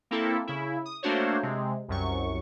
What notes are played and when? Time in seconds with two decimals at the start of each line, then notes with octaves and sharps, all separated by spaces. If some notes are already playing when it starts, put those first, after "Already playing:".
0.11 A#3 C4 E4 A4
0.47 C#3 E4
0.85 D#6
1.03 A3 A#3 D4 F#4 C5 C#5
1.43 C3 G#3
1.88 C2 F#2 C#6